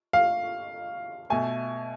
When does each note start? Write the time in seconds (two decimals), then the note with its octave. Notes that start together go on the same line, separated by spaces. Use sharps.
0.13 F5
1.30 B2 A3 G#5